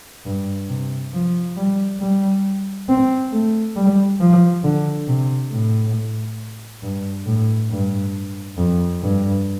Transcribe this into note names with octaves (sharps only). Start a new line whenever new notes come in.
G2
C3
F3
G3
G3
C4
A3
G3
F3
D3
C3
A2
G2
A2
G2
F2
G2